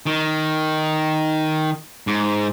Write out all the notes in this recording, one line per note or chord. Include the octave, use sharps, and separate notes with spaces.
D#3
G#2